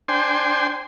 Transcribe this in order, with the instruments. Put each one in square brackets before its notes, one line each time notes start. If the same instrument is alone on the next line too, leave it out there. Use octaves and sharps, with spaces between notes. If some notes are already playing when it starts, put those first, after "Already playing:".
[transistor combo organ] D4 C5 G5 G#5 C6